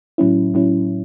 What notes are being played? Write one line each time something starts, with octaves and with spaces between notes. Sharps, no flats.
A2 F#3 C#4 E4
A2 F#3 C#4 E4